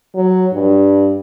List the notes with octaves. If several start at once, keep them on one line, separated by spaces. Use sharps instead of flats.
F#3
G2